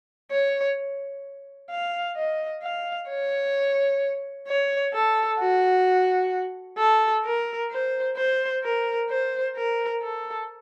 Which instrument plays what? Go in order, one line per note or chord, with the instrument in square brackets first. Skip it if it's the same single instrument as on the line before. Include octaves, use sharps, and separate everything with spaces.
[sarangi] C#5
F5
D#5
F5
C#5
C#5
A4
F#4
A4
A#4
C5
C5
A#4
C5
A#4
A4